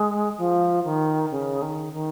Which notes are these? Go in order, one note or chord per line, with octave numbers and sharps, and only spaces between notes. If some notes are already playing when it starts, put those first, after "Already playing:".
Already playing: G#3
F3
D#3
C#3
D#3
D#3